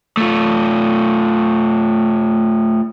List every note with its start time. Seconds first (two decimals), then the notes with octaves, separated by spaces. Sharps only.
0.17 A3 F4